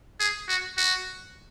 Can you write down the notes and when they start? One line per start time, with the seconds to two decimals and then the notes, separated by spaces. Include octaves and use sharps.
0.20 G#4
0.48 F#4
0.77 F#4